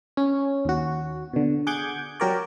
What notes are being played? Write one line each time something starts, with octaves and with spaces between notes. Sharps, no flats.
C#4
D#2 F#4
B2 D3
G#4 F#5 D6 G6 G#6
F#3 G4 A#4 C#5 D5